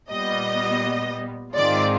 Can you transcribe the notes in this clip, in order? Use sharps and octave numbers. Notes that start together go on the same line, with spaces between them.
A#2 G3 B3 D#5
G#2 D#3 G#3 C4 F4 D5